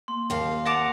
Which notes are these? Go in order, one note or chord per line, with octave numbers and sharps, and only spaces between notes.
A#3 C6
D#2 F5
F#5 A5 D6 A#6 F7